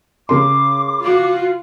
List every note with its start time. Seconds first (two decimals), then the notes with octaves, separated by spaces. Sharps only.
0.29 C#3 A#4 C6 D6
1.01 F4 F#4